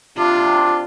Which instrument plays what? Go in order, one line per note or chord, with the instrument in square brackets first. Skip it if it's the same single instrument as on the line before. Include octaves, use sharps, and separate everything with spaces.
[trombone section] C3 D4 [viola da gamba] F4